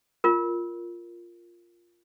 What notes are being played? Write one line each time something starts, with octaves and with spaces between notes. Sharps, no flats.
F4 A#4